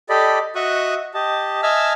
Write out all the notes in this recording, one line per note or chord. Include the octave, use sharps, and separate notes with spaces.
G4 A4 D5 D#5 B5
F#4 D#5 E5 C#6 D#6 F#6
G4 D#5 A5
D#5 E5 G#5 A5 E6 F6